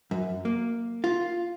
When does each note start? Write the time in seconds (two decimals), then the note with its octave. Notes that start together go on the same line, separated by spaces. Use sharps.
0.11 F#2
0.45 A#3
1.04 F4